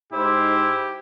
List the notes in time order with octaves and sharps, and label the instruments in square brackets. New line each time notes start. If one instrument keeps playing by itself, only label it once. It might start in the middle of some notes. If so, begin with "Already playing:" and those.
[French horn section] G#2 D#4 C5 [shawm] E4 [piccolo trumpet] G4